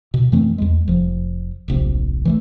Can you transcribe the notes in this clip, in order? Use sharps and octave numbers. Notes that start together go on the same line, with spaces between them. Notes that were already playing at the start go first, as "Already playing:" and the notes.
B2
F#2 E3 A3 C4
E2 G3 G#3
F1 F3
D1 A#1 C3
E3 F#3 A3